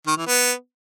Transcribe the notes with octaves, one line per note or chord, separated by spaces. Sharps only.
D#3
E3
B3